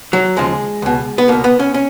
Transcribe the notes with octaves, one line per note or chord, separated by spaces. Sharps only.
F#3
D#2 C#3 F3 G#3
C#2 B2
B3
C#2 B2 A#3
B3
C#4
C#4